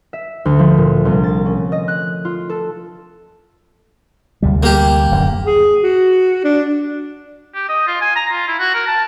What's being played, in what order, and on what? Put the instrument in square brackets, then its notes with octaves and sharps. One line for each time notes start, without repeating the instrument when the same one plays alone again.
[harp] E5
D2
F3
A#2
C2
A6
C#4
D#5
F#6
F4
A4
[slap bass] D2 C3 G3
[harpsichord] A#3 G4
[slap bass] D1 F#2 D3
[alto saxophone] G#4
F#4
D4
[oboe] G4
D#5
F4
G#5
A#5
F4
E4
F#4
A#4
A5